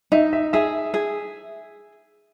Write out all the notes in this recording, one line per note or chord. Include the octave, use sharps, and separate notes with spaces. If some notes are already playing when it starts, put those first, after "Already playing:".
D#4 E5
E5
G#4 E5
G#4